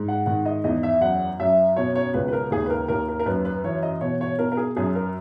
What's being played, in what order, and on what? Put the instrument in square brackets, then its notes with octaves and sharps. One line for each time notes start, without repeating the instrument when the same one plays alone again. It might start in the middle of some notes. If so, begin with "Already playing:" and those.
Already playing: [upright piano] G#2
F#5
D#3 F#5
D#5
E2 D#5
E5
F#2 F#5
F#2 E5
B2 C#5
C#5
C#2 B4
B4
A#4
D#2 G#4
B4
A#4
D#2 A#4
A#4
A#4
F#2 B4
B4
E3 C#5
D#5
B2 C#5
C#5
B2 A#4
A#4
G#4
F#2 G#4
A#4